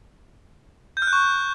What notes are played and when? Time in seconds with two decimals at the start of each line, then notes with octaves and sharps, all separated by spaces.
0.97 G6
1.02 F6
1.07 F#6
1.13 C#6